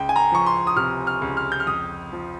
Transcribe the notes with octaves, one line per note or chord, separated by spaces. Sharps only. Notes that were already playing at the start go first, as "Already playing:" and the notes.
Already playing: C#2 G5
G#5
A#5
F3 C#6
C6
D#6
C3 F6
F6
C#2
F6
G6
F6
F2 D#6
F3